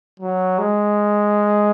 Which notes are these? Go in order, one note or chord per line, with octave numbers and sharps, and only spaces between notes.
F#3
G#3